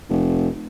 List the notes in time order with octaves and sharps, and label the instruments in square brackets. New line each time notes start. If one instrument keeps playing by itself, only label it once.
[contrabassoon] F1